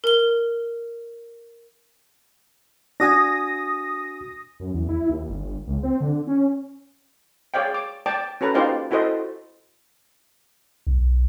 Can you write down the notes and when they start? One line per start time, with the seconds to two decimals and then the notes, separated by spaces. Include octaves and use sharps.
0.04 A#4 G7
3.00 D4 F#4 G#5 D#6 A#6
4.60 F#2
4.74 E2
4.89 E4
5.10 D#2
5.29 G1
5.67 C#2
5.83 C4
6.00 D3
6.27 C#4
7.54 G#4 C#5 D5 F5 G5
7.74 D6
8.06 D5 G5 A5 D6
8.41 C#4 F#4 A4 B4 A#5
8.54 D#4 F4 G4 C5 D5 F5
8.91 E4 F#4 A4 C5 D#5
10.87 B1